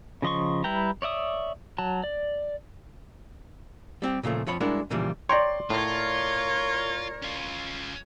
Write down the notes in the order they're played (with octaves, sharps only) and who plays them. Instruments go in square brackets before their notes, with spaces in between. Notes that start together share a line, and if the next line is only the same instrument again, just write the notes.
[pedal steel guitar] C#3 F3 D#5 C6 C#6
G3 E4 B4 G5 A#5
C#5 D5 E5 D#6
F#3 A5
D5
[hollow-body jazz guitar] G3 C4 G4
A#2 C#3 F3 A3
F2 F3 C#5 B5
G3 G#3 D4 E4 F#4 A#4
A#2 C#3 E3 F3 G3
[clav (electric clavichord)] C#5 G5 A#5 [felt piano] D5 C6
[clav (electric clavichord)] A2 [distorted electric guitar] F4 [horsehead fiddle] A#4 C#5
[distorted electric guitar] C#4 F4